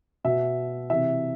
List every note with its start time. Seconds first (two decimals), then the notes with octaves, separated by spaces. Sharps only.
0.24 B2 E5
0.90 C3 E3 E5